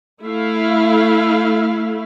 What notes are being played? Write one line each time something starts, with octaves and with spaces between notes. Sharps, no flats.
A3 E4 F5